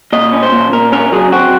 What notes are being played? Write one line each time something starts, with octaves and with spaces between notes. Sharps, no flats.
A#2 D#5
C#4
C5
A#2
A#2 A#4
C#4 A#4
F#3 G#4
C4 F#4